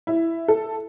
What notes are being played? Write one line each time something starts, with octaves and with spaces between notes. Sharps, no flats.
E4
A4